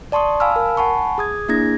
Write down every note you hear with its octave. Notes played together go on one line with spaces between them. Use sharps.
D5 A5 C6 C#6 D#6
F5 G#5 A5 B5 E6 F6
A#4
F#5 G#5 A5 B5 C#6
G#4 D#6 G#6
A#3 D4 E4 G#4 G#6 A#6